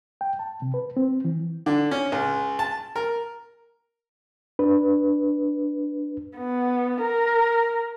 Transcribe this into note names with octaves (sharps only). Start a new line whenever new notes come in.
G5
A5
C3
B4
C4
E3
D3
C#4
C#2
A5
A#4
D4 B4
B3
A#4